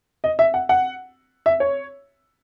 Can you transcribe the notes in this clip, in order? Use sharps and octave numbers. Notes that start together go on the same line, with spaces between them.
D#5
E5
F#5
F#5
E5
C#5